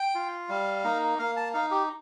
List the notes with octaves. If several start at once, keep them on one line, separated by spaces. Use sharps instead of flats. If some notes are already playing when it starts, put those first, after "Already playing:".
Already playing: G5
F4
G3 F5
A#3 D#4
A#3 F5
A5
D#4 F5
G4